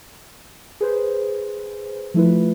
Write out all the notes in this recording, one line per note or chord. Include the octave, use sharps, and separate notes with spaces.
G#4 B4 C5
F3 A3 E4 F4 B4